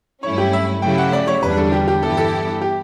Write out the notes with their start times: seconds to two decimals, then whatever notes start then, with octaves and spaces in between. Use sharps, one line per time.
0.23 G2 F#3 A3 C#4 E4 C#5
0.38 G4
0.53 E5
0.82 C#3 F#3 A3 E4 G4 G5
0.98 F#5
1.13 D5
1.27 C#5
1.42 E2 D3 G3 D4 B4
1.57 A4
1.72 G4
1.88 G4
2.02 G2 E3 B3 E4 G4 A4
2.17 A4
2.61 G4